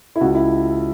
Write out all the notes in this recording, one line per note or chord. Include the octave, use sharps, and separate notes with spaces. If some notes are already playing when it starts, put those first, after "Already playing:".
E4
C#2 F#4
E4